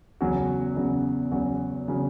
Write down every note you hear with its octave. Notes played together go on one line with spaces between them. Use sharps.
E2 C#3 F#3 C#4 F#4
E2 C#3 F#3 C#4 F#4
E2 C#3 F#3 C#4 F#4
C#3 F#3 C#4 F#4